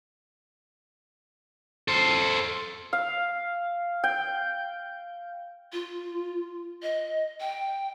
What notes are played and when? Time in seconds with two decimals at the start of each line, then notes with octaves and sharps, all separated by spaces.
1.88 A4 C5
2.93 F5
4.04 G5
5.73 F4
6.83 D#5
7.40 G5